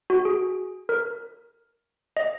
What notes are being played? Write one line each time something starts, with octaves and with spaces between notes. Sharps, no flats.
F#4
G#4
A#4
D#5